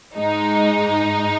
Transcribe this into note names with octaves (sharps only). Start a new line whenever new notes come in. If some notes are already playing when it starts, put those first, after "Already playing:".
G#2 G#3 D#4